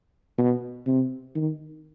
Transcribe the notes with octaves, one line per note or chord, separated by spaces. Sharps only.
B2
C3
D#3